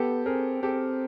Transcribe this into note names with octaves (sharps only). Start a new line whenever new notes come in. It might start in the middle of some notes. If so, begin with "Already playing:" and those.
Already playing: B3 G4 A4
C4 G#4 A#4
C4 G4 A4